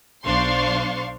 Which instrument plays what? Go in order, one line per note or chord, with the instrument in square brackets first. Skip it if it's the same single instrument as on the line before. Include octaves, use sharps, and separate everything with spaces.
[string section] B1 D4 C5 F5 C6 C#6